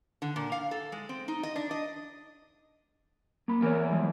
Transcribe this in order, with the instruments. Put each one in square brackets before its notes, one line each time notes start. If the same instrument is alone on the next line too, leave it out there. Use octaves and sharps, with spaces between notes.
[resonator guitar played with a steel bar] D3
A#2
F5
A4
G#3
C4
D#4
D#5
D4
D#5
[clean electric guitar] A#3 B5
[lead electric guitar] E2 [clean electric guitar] A#4 C#5
[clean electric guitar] E3 F3 G#3